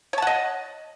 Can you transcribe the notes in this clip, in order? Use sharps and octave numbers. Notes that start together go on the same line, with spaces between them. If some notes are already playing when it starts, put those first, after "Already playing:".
C#5 D#5 F#5 A5